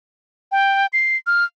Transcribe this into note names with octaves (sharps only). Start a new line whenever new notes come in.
G5
C7
F6